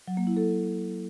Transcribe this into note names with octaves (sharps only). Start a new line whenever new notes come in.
F#3
A#3
E4
A4